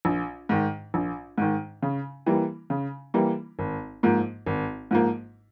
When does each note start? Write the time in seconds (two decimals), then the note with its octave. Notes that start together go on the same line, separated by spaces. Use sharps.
0.05 A#1
0.49 G#2 D#3
0.94 A#1
1.38 G#2 D#3
1.82 C#3
2.26 E3 G3 A#3
2.70 C#3
3.14 E3 G3 A#3
3.59 G#1
4.03 G#2 F3 A#3
4.47 G#1
4.91 G#2 F3 A#3